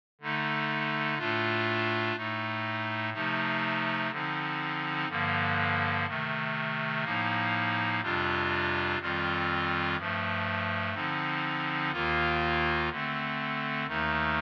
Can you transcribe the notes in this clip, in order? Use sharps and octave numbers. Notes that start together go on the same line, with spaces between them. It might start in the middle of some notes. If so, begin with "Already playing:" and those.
D3 A3 D#4
A2 A3 D4 F4
A2 A3 D#4
C3 F3 A3 D#4
D3 F3 C4 D#4
G2 D3 F3 A#3
C3 D#3 A3
A2 F3 A#3 D#4
F2 C3 G3 D4 F4
F2 D#3 G3 C4 F4
G2 F3 A3
D3 F3 C4 D#4
D#2 D#3 A#3 F4
D3 A3 C4
D#2 D#3 A3 D#4